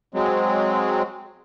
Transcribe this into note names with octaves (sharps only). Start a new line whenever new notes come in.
F#3 G#3 C4